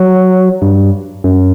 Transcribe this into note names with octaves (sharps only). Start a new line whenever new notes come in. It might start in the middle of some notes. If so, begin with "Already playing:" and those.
Already playing: F#3
G2
F#2